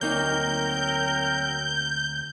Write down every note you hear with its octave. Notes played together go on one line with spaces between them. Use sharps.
D2 F#3 A#3 C4 D#4 A#4 G6